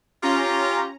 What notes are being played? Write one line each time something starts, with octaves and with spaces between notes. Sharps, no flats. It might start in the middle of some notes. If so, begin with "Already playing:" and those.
C#4 F4 G4 A#5